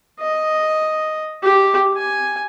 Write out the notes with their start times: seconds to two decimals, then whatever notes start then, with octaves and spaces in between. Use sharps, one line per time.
0.20 D#5
1.43 G4
1.96 G#5